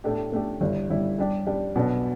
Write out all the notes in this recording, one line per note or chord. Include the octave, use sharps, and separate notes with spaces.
A2 A3 D4 G4
A2 A3 D4 G4
G1 G2 G3 E4
G1 G2 G3 E4
G2 G3 D4 G4
G2 G3 D4 G4
B1 B2 B3 D4